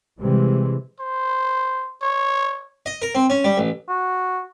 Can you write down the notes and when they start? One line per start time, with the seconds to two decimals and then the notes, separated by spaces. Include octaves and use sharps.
0.20 C3 E3 G3 G#3
1.00 C5
2.02 C#5
2.86 D#5
3.02 A#4
3.15 C4
3.30 C#4
3.44 G3
3.58 A1
3.89 F#4